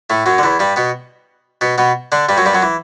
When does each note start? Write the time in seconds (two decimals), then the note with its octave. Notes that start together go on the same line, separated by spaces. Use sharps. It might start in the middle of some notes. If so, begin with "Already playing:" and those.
0.10 A2 A3
0.26 F#2 F#3
0.38 D3
0.43 E2 E3
0.59 G2 G3
0.76 B2 B3
1.61 B2 B3
1.78 B2 B3
2.12 D3 D4
2.29 G2 G3
2.37 F#2 F#3
2.45 G2 G3
2.54 F#2 F#3
2.62 E3